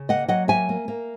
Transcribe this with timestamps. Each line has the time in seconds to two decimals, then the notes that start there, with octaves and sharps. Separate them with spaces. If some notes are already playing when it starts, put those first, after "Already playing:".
Already playing: C#3
0.09 A#3 D#5 F#5
0.28 F#3 D#5 F#5
0.48 A#3 E5 G#5
0.69 A#3
0.88 A#3